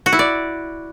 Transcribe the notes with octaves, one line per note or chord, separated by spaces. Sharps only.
F#4
E4
D5